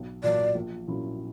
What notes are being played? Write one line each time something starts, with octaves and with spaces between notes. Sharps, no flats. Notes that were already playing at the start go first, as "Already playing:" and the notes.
Already playing: B1
A#2 F#3 D5
A#1
A#2 F#3 C#4 E4